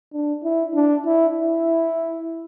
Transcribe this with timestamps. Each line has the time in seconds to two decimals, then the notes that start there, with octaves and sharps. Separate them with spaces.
0.13 D4
0.44 E4
0.75 D4
1.06 E4
1.37 E4